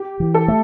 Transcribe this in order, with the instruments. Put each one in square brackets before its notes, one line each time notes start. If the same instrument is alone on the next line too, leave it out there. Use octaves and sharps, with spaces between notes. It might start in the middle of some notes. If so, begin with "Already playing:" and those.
Already playing: [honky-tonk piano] G4
[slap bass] E3
[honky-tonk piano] A4
[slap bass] A3